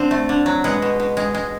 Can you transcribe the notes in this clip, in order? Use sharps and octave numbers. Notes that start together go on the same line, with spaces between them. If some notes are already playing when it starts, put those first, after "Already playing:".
Already playing: D3 C4
A3
D3
F#3
G#3 B3
B2
B2
G#3
G#3